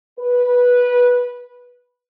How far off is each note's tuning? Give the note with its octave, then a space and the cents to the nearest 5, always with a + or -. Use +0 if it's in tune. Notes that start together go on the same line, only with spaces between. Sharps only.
B4 -10